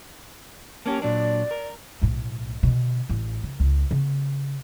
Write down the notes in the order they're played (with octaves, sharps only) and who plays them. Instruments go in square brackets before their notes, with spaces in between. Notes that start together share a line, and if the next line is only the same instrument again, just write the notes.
[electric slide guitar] A#3 C#4 G4 [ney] A5
[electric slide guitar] A#2 F#3 D4 [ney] D5
[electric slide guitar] A#4
[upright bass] B1 A2
B2 D3
A1
C#3
C#2
C#3 B3